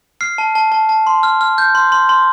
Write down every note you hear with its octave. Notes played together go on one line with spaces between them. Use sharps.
F6 C7
A5
A5
A5
A5
C6
F6
F6
G6
C6
C6
C6